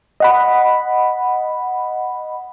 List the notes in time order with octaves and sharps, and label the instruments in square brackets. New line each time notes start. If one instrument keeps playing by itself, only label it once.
[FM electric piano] D#5 F#5 B5